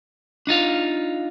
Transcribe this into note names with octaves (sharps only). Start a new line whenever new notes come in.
D4 D#4 F4 F5